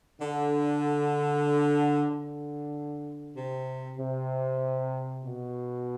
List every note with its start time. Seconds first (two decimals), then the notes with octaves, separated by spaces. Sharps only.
0.21 D3
2.09 D3
3.35 C3
3.98 C3
5.25 B2